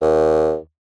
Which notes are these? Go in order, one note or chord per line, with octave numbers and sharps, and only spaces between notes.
D#2